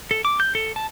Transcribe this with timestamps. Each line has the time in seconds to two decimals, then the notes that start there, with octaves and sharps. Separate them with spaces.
0.11 A4
0.25 D6
0.40 G6
0.55 A4
0.76 A5